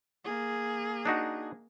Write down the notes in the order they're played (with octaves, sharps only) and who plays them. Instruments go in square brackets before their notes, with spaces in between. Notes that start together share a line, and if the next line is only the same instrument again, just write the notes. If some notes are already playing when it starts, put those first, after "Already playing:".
[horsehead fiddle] A#3 G#4
[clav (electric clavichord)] D4 D#4 F#4